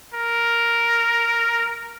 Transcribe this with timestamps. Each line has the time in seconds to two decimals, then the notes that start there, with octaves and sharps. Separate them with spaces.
0.14 A#4